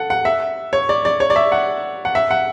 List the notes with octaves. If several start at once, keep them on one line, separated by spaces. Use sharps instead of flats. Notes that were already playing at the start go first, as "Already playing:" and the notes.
Already playing: A4 F#5
F#5
E5
C#5
D5
D5
C#5
D5
E5
F#5
F#5
E5
F#5